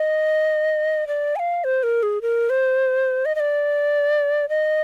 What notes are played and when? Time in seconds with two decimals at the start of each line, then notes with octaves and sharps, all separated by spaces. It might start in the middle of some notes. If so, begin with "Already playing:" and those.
Already playing: D#5
1.07 D5
1.36 G#5
1.39 F5
1.64 C5
1.83 A#4
2.03 G#4
2.22 A#4
2.50 C5
3.25 D#5
3.35 D#5
3.40 D5
4.49 D#5